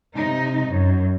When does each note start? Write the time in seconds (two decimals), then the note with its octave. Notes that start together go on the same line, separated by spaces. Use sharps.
0.15 C3 D#4
0.66 F#2